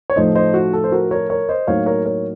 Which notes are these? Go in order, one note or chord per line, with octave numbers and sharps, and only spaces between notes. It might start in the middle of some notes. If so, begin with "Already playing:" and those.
C#5
A2 F3 A3 D#4 C5 D#5
C5 D#5
F#4
A4
C5
F#4 A#4
A#4 C#5
A#4 C#5
C5 D#5
A2 F#3 A#3 D#4 C#5 F5
A#4 C#5
A#4 C#5